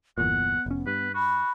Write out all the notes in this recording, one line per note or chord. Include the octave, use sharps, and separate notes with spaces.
G1 E2 A#2 B3 F#5
F1 C#4
G2 B4
F#4 B5